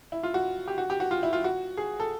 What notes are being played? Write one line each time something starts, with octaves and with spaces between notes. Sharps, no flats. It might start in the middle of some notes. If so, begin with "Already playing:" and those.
E4
F4
F#4
G4
F#4
G4
F#4
F4
E4
F4
F#4
G#4
A4